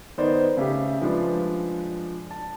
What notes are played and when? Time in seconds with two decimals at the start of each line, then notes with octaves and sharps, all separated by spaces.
0.18 D#3 B3 D#4 C5 D5
0.57 C#3 A3 G4
1.02 F3 G#3 D4 B4
2.31 A5